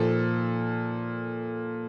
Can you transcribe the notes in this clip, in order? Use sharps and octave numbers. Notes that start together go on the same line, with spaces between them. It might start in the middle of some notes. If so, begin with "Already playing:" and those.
Already playing: A#2 F3 A4